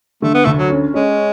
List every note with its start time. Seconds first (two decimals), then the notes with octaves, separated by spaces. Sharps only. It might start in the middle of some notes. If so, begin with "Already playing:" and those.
0.22 D3 A3
0.34 B3
0.45 D2 A3
0.58 F#3
0.70 C#4
0.94 G#3 C#4